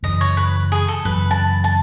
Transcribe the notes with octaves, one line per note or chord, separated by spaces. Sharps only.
F#2 C#3 E3 D#5
C#5
B4
G#4
A4
F#2 C#3 E3 B4
A5
A5